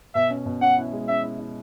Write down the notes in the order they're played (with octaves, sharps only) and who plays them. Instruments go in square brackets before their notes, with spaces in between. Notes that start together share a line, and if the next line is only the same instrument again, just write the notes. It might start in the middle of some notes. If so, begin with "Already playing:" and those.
[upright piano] B2 [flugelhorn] E5
[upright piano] C#4
B2
[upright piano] C#4 [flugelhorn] F#5
[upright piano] E4
G#3
[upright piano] C#4 [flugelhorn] E5
[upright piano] E4
E4